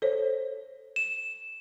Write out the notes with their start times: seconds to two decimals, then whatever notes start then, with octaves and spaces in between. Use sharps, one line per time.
0.02 A4 C5 C#5
0.96 E7